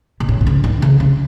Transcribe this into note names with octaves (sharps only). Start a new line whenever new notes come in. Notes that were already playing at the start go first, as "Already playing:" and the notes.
B2
A2
B2
C#3
D#3
C#3
C#3